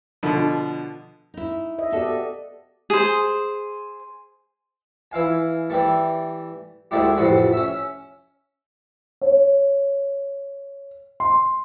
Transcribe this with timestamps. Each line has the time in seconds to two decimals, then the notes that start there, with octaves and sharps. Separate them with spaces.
0.23 B2 D3 F3
1.34 D#4 E4
1.79 D#5 E5
1.92 B3 F#4 G4 A4 D5
2.90 G#4 C5
5.12 E3 E4 F5 G#5
5.70 E3 G3 A3
6.91 D2 D3 G#3 A3 E4 G4
7.17 A1 F2 C3 F#4 B5
7.52 C#4 E5
9.21 C#5
11.20 C6